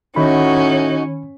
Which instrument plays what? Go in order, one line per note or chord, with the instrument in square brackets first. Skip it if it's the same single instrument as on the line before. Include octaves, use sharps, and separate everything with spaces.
[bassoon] A2 [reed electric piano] D#3 B5 [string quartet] C#4 [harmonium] D#4 F#4